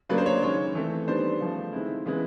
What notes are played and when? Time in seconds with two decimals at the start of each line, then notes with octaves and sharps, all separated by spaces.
0.09 C#3 F#3 A#3 D4 B4
0.18 C5
0.26 C#5
0.42 D#3 G#3 C#4 C#5
0.75 E3 A3 C4
1.08 D#3 G3 B3 D4 C5
1.41 C#3 F3 A3
1.73 D#3 G#3 C4 E4
2.06 C#3 E3 G#3 B3 E4